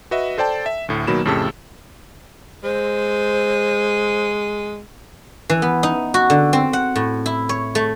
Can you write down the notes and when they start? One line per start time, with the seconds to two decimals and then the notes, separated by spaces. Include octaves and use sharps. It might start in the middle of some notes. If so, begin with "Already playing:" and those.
0.11 F#4 B4 D#5 E5
0.38 A4 C5 D5 G5 A5
0.66 E5
0.89 D2 A2
1.07 B2 D#3 F#3 A#3 B5 E7
1.25 F2 A2 C#3 G4 A5 E6
2.64 G#3 C5
5.50 E3
5.62 B3
5.83 D#4
6.14 F#4
6.30 D3
6.53 C4
6.73 F#5
6.96 A2
7.26 E4
7.49 C#5
7.75 A3